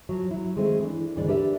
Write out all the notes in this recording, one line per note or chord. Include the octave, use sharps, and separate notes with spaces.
F3 F#3
F#3 E4
D#3 G#3 A3 C4
E3 D4
D#2 G#2 D3 E3 G#3 D5
D4 G4 A#4 B4 D5 E5